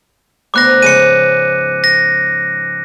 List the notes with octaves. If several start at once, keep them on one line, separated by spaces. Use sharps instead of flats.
D2 B3 C5 D6 F#6 A#6
G#2 C#3 F3 C#7 D#7
A#6